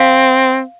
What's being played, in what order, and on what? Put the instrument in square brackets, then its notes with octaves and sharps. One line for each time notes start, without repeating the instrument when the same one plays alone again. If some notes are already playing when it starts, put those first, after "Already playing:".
Already playing: [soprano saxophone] C4 [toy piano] F5